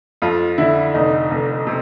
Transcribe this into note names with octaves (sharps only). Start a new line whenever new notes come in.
F2 F4
D3 E4
F1 D#4
F1
C3